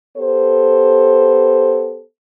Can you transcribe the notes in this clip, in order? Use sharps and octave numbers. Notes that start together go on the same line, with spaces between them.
B3 G4 A4 C5